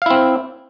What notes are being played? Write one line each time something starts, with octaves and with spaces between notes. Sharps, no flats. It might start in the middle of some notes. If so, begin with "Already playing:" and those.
C4 E4 F5